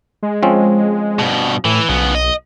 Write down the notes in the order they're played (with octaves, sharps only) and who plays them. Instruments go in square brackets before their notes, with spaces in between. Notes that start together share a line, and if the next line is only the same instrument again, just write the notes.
[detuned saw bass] G#3
[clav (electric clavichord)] F3 C4 C#4
[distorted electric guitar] G2 B2
[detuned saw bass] A2 [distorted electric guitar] E3
[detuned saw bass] B1 [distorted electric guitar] C#3 B3
[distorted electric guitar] D#5